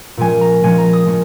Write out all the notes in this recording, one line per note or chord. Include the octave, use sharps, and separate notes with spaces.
A#2 F3 G#3 C#4 G#5
A#5
A#2 F3 G#3 C#4 G#5
A#5
D#6
A#2 F3 G#3 C#4